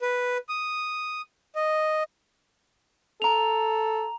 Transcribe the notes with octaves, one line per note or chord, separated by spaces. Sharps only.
B4
D#6
D#5
A4 A#5 F7